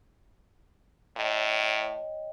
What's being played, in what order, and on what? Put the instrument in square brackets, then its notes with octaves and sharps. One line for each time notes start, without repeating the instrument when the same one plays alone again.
[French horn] A2 [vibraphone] C#5 D#5 G5